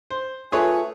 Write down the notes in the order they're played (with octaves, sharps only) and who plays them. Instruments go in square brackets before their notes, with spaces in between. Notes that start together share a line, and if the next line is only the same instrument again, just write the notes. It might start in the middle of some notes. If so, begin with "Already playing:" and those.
[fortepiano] C5
[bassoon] A3 [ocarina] F4 [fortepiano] G#4 B4 C#5 [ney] G#5